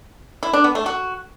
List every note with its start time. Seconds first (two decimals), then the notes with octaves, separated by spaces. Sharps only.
0.43 E4
0.53 D4
0.64 B3
0.75 A3
0.86 F#4